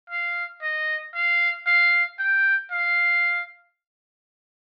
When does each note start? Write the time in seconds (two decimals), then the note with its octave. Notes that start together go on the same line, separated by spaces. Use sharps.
0.10 F5
0.63 D#5
1.15 F5
1.67 F5
2.19 G5
2.71 F5